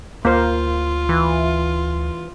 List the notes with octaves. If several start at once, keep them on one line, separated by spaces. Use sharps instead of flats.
D2 A#3 F4 A#4 C5
E3